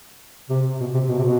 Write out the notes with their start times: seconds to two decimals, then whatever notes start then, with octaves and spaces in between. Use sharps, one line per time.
0.50 C3
0.80 B2
0.94 C3
1.09 B2
1.19 C3
1.24 B2